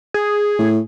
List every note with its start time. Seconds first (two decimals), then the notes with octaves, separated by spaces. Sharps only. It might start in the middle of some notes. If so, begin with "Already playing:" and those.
0.14 G#4
0.59 A2